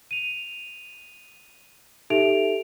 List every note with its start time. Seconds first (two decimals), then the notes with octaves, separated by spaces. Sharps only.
0.11 D#7 F7
2.10 D#4 G4 A4 E5 D7 F7